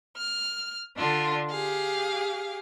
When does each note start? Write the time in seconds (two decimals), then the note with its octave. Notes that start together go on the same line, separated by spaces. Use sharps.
0.17 F6
0.96 D3 D4 F4
1.49 G4 G#4 F5